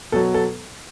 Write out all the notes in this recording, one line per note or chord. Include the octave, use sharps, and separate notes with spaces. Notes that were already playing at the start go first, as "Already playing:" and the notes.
B2 F#3 A4
A4